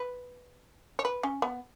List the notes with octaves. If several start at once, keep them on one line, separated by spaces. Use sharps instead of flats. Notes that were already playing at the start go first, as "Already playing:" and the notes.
Already playing: B4
C#5
B4
C#4
B3